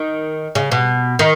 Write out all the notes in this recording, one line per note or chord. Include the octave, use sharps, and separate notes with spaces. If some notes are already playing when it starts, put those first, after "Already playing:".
Already playing: D#3
C#3
B2
D#3